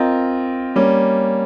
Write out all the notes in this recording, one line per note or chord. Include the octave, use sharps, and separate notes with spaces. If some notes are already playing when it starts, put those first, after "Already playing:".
Already playing: C4 F4 A#4 D#5
G3 A#3 C#4